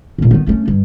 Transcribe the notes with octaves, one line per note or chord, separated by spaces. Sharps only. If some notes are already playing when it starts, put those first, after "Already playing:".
E2 A#2
D#3 B3
A3 C#4
G2